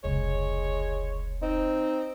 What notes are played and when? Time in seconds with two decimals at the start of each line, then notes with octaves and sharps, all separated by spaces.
0.04 F1 C#2 G#3 C#5
1.42 C4 D#4